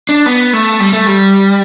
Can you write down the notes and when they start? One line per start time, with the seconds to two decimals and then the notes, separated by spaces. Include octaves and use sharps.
0.09 D4
0.26 B3
0.53 A3
0.80 G3
0.93 A3
1.07 G3